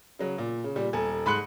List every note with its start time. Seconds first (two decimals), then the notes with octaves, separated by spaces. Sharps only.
0.19 C#3 F#3
0.38 A#2
0.64 C#3
0.76 A#2 G3
0.93 D#1 A4 G#5
1.26 G#2 B5 C6 F#6 C#7 F#7